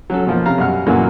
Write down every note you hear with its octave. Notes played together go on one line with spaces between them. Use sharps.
F#3 C#4 A4
B2 F3 A#3
C3 C#4 F5 A#5
F#2 B2 G3 F5 F#5 F6
F#2 A#2 C#3 E3 F#3 A#3